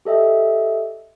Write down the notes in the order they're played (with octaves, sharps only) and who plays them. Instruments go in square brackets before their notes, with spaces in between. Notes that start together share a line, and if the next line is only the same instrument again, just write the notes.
[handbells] G4 A4 D#5 E5 G5